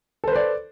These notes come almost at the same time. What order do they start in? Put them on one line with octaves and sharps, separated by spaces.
A4 C5 B4 D5